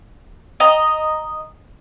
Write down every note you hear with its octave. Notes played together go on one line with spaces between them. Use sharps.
D#5 A#5